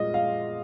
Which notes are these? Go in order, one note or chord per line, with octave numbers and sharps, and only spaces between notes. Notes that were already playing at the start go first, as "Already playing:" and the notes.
Already playing: A#2 G#3 F4 D#5
F5